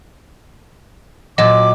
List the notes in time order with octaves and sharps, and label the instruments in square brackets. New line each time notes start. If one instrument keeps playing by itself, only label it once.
[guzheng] A#2 F#3 A5 [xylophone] D#5 [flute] D6